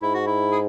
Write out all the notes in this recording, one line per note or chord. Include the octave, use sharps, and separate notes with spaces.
G#2 E4
F#4
E4
G#4